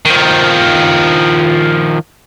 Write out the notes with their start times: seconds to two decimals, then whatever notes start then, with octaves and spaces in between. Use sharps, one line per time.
0.05 D#3 F3